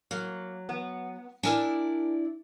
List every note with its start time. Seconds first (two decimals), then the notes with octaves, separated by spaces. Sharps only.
0.11 F#3 A#3
0.69 B3
1.43 D4 E4 A#4 D5 G#5